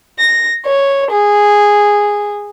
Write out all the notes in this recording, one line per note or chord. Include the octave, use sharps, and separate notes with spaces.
A#6
C#5
G#4